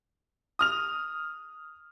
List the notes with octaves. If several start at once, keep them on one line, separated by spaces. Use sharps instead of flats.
D#6 F6 F7